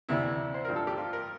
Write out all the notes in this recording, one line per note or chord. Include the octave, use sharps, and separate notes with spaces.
D2 C3 E3 E4
C5
G2 F3 A#4
A4
G4
F4
A#4